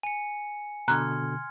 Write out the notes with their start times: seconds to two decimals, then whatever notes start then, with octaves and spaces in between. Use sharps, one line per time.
0.03 G#5 C#7
0.88 B2 D3 A#5 C6 F6 F#6 G#6